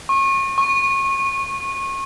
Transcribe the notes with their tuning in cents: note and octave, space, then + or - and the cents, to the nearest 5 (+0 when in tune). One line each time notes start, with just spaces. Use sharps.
C#6 -30
C#6 -20